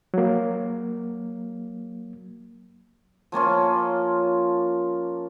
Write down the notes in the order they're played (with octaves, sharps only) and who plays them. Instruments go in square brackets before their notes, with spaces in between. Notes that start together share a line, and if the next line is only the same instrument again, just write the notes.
[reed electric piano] F#3 A#3
[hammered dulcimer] F3 A#3 C#4 F4